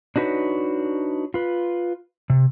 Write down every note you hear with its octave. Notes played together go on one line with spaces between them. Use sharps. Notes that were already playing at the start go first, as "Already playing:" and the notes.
D4 D#4 F#4 B4 C#5
F4 B4
C3